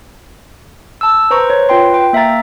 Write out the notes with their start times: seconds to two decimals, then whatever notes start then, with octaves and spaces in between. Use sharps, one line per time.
1.01 A5 E6
1.31 B4 C5 A#5 C#6
1.50 C#5
1.69 F4 B4 G5 C6
1.94 G5
2.13 A#3 E5 F5 A#5 A6